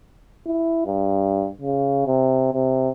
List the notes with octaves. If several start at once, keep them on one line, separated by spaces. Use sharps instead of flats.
E4
G2
C#3
C3
C3